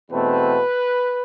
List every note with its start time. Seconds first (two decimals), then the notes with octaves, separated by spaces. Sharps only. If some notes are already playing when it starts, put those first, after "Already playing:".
0.11 E2 B2 A3 C4 B4